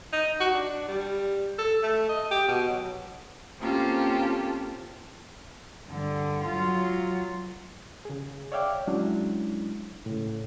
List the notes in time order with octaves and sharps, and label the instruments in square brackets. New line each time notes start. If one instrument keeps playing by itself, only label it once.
[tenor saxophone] D#4
F#4
D4
G3
A4
A3
D#5
G4
B2
F#3
[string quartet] A#3 C4 C#4 F4 G4 A4
[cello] G2 D3
F#3 F4
[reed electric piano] C#3 G#4
C#5 D5 E5 F5 G5 D6
F#3 G#3 C#4 D4 E4
A2 C#3